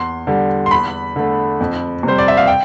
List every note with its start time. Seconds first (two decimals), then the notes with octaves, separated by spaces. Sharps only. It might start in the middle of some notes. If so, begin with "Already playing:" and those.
Already playing: E2 C6
0.27 D3 G3
0.66 C6
0.71 E2 B5
1.16 D3 A3
1.60 F2
2.03 C3 G3 C5
2.18 D5
2.28 E5
2.37 F5
2.48 G5